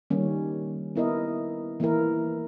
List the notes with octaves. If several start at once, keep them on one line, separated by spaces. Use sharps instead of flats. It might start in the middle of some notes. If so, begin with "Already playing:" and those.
D#3 G3 A#3 C#4
B3 E4 A#4 D#5
E3 A#3 E4 A#4